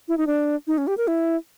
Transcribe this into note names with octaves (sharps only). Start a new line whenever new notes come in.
E4
D#4
D4
D#4
C#4
G4
A#4
E4